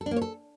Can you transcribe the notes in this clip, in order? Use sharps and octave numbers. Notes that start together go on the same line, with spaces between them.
A4
D4
A#3
C#5
A4